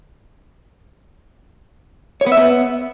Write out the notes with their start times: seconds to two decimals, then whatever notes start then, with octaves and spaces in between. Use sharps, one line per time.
2.21 C#5
2.26 B3
2.32 E5
2.37 B3